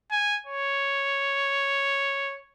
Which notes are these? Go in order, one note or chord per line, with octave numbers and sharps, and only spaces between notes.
G#5
C#5